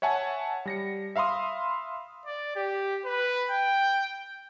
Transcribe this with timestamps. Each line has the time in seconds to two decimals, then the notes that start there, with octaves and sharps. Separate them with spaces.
0.02 C#5 E5 F#5 G#5 A5
0.66 G3 A#6 C#7
1.16 E5 F5 B5 C6 D#6
2.26 D5
2.56 G4
3.05 B4
3.51 G5